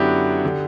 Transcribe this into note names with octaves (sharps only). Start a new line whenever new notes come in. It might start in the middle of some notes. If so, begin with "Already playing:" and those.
Already playing: F#2 D3 B3 D4 E4 F#4 G4
D3